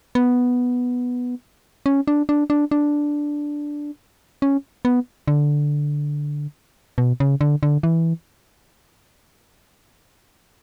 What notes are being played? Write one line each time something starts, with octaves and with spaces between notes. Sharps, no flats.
B3
C#4
D4
D4
D4
D4
C#4
B3
D3
B2
C#3
D3
D3
E3